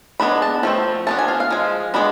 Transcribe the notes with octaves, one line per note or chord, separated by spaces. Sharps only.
G#3 B3 D4 B5
A5
F3 A3 C4
F3 B3 D4 A5
G#5
F5
F5
F3 G#3
G#3 B3 D4 B5